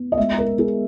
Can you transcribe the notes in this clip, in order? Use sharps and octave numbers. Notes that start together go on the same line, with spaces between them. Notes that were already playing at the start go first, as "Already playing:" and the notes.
Already playing: B3
D#5
G#3 E5
A#4
B3
G#4